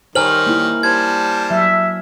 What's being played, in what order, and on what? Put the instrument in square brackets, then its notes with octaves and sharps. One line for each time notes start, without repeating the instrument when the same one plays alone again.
[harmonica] D#3 G3 [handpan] C5 C#5 [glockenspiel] G#5 F6 F#7
[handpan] A#3 E4
[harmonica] G3 C5 A5 [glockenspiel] G#6
[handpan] F#3 [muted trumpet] E5